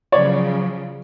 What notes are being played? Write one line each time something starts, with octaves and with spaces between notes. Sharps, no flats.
C#3 F3 F#3 C#5 D5